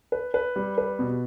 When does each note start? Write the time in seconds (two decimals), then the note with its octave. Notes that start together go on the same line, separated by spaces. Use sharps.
0.12 B4
0.34 B4
0.56 G3
0.78 B4
0.99 B2